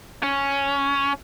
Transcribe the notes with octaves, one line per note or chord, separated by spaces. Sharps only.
C#4